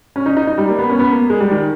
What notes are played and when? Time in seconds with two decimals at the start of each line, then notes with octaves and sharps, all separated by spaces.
0.16 C#4
0.26 D#4
0.37 D#4
0.47 D#4
0.58 G3
0.68 A#3
0.79 B3
0.89 C#4
0.99 B3
1.10 A#3
1.30 G#3
1.40 G3
1.51 D#3